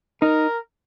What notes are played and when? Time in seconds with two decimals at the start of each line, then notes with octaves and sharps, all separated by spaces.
0.22 D#4 A#4